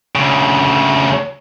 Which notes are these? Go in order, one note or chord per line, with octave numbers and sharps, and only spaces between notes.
D2 C#3